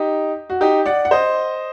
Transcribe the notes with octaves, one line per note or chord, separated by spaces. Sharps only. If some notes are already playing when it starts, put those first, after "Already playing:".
Already playing: D#4 G4
F#4
D#4 G4
D5 F#5
F#5
C5 D#5